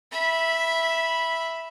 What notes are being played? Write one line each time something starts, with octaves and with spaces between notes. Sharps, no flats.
E5 B5